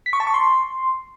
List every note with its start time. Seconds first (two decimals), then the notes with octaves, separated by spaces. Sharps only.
0.06 B6
0.13 C#6
0.20 A5
0.27 C#6
0.34 C6